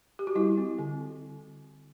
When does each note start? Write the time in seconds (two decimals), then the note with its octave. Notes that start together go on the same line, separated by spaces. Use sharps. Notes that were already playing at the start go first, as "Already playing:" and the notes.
0.19 G4
0.27 F#4
0.35 G3 E4
0.58 C4
0.79 D3